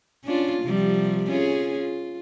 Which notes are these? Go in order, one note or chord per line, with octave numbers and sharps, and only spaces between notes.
C#4 D4 F4
C3 F3 G3
C#4 F4 G#4
F4